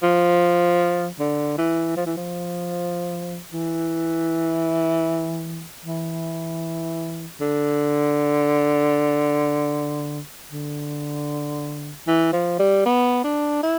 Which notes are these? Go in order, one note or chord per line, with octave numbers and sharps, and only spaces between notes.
F3
D3
E3
F3
E3
F3
E3
E3
D3
D3
E3
F3
G3
B3
D4
E4